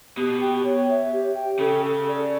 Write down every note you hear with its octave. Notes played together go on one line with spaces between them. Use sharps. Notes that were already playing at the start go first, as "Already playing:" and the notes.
B2 G4
G5
C#5
E5
G4
G5
C#3 A4
A4
D5